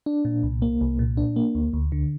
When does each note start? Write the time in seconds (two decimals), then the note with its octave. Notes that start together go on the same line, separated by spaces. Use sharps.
0.06 D4
0.25 A#2
0.43 C2
0.62 A#3
0.81 C2
0.99 A#2
1.17 D4
1.36 A#3
1.55 D2
1.73 D2
1.92 D3